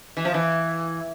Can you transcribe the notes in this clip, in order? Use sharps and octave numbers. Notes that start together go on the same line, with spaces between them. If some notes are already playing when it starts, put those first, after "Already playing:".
E3
F3
E3